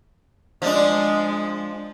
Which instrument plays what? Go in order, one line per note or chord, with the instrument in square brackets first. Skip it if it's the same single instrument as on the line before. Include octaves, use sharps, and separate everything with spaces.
[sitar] F3 D4 [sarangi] G#3